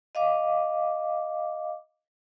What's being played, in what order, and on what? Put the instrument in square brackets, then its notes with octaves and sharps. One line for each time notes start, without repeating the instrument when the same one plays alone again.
[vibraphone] D#5 F5 D6